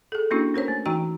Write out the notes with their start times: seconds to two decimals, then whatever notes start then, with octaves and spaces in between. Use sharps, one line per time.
0.12 G#4 A4
0.31 A#3 C#4 D4 E4 F#4
0.54 C#4 A#4 C5 C#5
0.68 A3
0.85 E3 D#4 F#4 G5 A#5